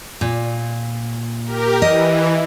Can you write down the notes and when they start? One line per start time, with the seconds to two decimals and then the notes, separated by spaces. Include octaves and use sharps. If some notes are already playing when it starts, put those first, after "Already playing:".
0.21 A#2
1.45 G4 A#4
1.82 E3 D#5